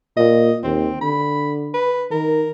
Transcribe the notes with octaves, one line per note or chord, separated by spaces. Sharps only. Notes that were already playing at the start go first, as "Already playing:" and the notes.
A#2 D#5
D#2 C4
D3 B5
B4
D#3 A#4